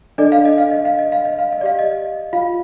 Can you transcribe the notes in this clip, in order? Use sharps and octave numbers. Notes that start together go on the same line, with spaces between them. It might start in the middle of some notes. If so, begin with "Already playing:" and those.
D4 A4 D5 D#5
F5
D#5
F5
D#5
F5
D#5
F5
D#5
F5
D#5
G4 D5 F5
D#5
F4 F5